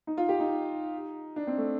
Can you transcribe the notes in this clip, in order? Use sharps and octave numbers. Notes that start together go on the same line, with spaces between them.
D#4
F4
G4
D#4
D4
C4
A3